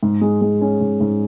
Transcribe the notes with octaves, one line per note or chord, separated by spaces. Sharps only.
G#2
G#3
G#3
C#4
G#2
G#2